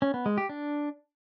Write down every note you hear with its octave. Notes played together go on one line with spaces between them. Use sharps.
C#4
B3
G#3
G4
D4